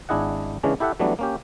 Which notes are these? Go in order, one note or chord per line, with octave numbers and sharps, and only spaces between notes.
G#1 D4 E4 G#4 D#5 F#5
C#3 E3 G#3 C#4 D4
E4 G4 A4 E5 F#5
E3 F#3 G3 A3 B3 D4
A#3 C#4 G4